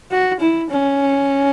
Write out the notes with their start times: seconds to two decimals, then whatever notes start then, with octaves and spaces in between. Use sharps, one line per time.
0.11 F#4
0.40 E4
0.71 C#4